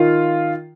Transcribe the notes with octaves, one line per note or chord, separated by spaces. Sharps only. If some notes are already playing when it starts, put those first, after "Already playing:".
Already playing: D#3 F4